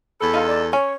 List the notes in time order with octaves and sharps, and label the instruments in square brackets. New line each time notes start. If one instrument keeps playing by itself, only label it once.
[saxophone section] E2 A4 [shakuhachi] B5
[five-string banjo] D#4 F4 F5
[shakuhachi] D5
[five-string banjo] C#4 [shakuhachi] C#5